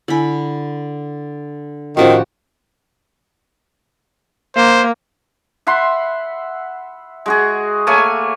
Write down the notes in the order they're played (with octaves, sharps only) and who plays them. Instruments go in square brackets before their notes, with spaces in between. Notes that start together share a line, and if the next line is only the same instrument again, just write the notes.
[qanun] D3 B5 [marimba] E4 G#5
[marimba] A2 C#4 C5 [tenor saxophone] D#3 [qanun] F3 F#4 G4
[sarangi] A#3 [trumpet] C5
[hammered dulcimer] E5 F#5 B5 C6
G#3 F#4 G#4
A3 A#3 C#5 G#5